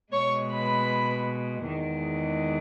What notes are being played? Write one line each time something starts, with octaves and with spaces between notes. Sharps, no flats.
B2 G#3 C#5 C#6
B4 B5
E2 D#3 G#3